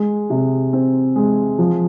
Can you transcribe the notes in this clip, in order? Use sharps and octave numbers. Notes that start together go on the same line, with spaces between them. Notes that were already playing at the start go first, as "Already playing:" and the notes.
Already playing: G#3
C3
C4
G#3
F3